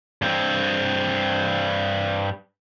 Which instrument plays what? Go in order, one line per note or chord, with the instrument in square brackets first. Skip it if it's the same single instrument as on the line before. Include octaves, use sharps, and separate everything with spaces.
[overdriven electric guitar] G2 C4